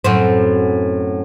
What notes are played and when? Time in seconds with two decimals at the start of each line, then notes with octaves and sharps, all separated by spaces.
0.04 F#2 A2 C4